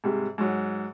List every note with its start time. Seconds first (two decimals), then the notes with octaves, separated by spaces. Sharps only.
0.04 G#2 C3 G3 G#3
0.38 G#2 F#3